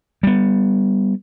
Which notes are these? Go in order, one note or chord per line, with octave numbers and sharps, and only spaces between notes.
G3 B3